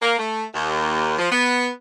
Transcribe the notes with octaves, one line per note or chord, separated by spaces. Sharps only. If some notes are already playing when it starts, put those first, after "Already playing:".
A#3
A3
D#2
F3
B3